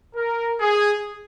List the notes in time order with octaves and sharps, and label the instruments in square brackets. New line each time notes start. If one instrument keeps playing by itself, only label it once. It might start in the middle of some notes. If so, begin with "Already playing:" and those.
[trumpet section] A#4
G#4